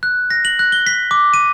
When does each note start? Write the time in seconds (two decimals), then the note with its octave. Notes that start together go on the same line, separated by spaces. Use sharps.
0.03 F#6
0.30 A#6
0.45 F#7
0.59 F#6
0.72 G7
0.87 B6
1.11 D6
1.34 D#7